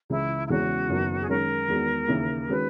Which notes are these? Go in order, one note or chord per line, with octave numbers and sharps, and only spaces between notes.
C#2 C#3 E3 E4
E4
E2 C#3 E3 G#3 C#4 F#4
F#1 F#2 D#3 F#3 B3
G#4
F#2 D#3 G#3 C#4 A#4
E2 D#3 G#3 B3 F#4
D#2 C#3 E3 A#3 E4
D#3 G#3 C#4 F#4 B4